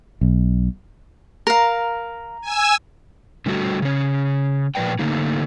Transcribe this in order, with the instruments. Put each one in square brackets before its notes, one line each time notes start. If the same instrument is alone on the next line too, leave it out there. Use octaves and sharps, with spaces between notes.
[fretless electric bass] B1
[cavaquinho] A#4 F5 [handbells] A#5
[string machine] G#5 E6
[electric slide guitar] D3 G3 A3 F#4
C#3 C#4
A#2 F3 A#3 B4 D5 G5
D3 A3 A#3 D#4